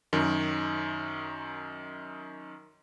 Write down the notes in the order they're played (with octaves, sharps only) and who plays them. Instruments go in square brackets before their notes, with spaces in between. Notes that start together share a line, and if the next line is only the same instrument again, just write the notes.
[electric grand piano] F#2 D#3